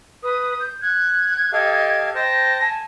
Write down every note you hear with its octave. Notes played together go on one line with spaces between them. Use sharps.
B4 D#6
G6
F#6 G#6
G4 A4 D#5 F5
C5 G5 A5 A#6
G#5 A5